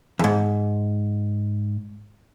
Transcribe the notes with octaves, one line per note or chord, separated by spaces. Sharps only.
E2 G#2